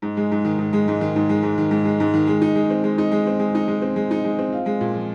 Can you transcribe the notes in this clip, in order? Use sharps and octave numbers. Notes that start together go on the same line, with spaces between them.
G#2
G#3
G#2
D#3
G#2
G#3
G#2
D#3
G#2
G#3
G#2
D#3
G#2
G#3
G#2
D#3
G#3
D#4
G#3
C4
G#3
D#4
G#3
C4
G#3
D#4
G#3
C4
G#3
D#4
G#3
C4
F4
G#3
A#2
F3